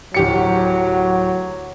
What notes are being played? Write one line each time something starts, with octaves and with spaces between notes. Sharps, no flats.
D1 F#3 G4 C#7